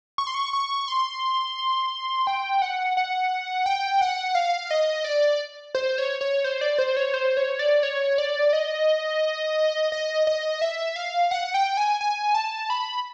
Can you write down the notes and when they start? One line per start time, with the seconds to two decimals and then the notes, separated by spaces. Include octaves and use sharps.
0.18 C#6
0.27 C6
0.34 C#6
0.53 C#6
0.88 C6
2.27 G5
2.62 F#5
2.97 F#5
3.66 G5
4.01 F#5
4.35 F5
4.71 D#5
5.04 D5
5.75 C5
5.98 C#5
6.21 C#5
6.44 C5
6.61 D5
6.78 C5
6.97 C#5
7.14 C5
7.37 C#5
7.59 D5
7.83 C#5
8.18 D5
8.53 D#5
9.92 D#5
10.27 D#5
10.61 E5
10.96 F5
11.31 F#5
11.54 G5
11.77 G#5
12.01 G#5
12.34 A5
12.70 B5